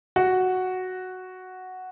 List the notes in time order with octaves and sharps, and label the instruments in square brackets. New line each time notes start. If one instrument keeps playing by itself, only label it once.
[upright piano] F#4